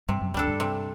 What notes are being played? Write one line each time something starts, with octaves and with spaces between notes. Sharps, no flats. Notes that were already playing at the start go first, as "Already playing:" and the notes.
G2 C3 G3
F#2 F#3
D2 D3 G3 D4 A4
G2
C3